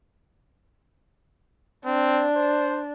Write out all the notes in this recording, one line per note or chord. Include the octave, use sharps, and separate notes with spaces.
C4 D4
C5